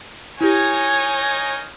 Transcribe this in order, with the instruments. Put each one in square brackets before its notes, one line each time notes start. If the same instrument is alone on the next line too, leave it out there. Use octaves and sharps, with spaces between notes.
[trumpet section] D#4 A#4 D#5 [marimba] E4 G4 [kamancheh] C#5 G#5